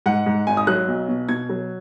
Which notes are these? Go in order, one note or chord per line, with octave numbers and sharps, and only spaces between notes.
G#2 F#5
G#2
G#1 G#5
D#6
F#3 F#6
B1
B2
B2 G#6
F#3